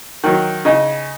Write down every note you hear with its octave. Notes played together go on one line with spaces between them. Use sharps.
D#3 F#3
C#3 D#4